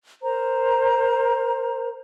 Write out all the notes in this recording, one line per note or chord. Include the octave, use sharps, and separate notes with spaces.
A#4 C5 A#5